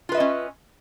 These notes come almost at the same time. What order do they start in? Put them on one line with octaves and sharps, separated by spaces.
F4 B4 E5 D#5 C#4